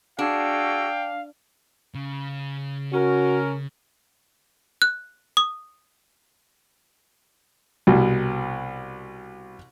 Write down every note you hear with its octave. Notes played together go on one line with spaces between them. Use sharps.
D4 F#4 G#4 F5 G5 E6
C#3
C#4 F#4 A#4
F#6
D#6
C2 B2